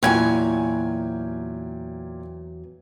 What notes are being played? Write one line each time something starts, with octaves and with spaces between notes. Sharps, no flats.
E2 A#2 F#3 G5 G#5 G#6